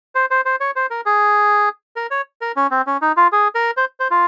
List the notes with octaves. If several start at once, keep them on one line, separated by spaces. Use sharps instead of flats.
C5
C5
C5
C#5
C5
A#4
G#4
A#4
C#5
A#4
C#4
C4
C#4
D#4
F4
G#4
A#4
C5
C5
F4